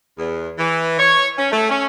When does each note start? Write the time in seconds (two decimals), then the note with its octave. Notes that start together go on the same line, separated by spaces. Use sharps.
0.18 E2
0.58 E3
0.98 C#5
1.37 C#4
1.52 A3
1.68 C#4